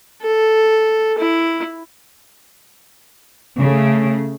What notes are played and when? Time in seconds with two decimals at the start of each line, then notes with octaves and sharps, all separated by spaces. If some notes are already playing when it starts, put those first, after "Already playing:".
0.22 A4
1.19 E4
3.60 C#3 A3